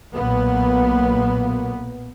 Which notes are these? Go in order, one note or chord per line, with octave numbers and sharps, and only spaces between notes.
B1 A#2 A#3 B3